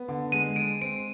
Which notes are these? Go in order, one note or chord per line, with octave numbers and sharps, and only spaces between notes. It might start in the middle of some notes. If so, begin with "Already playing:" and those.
Already playing: B3
D3
G#3 D#7
G#3 D7
C4 D7